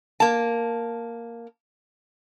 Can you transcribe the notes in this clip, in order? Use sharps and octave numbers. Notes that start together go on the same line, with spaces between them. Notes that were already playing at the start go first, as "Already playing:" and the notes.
A#3 A5